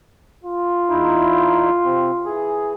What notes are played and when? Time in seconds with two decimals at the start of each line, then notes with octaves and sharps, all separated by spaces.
0.44 F4
0.89 E2 D#4 E4
1.85 C3 C4
2.25 E3 G#4